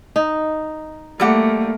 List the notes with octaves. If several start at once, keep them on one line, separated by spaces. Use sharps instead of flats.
D#4
G3 A3 A#3 G4 F#5